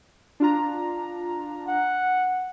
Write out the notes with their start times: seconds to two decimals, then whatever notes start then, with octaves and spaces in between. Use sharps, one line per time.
0.40 D4 F4 A#5
1.69 F#5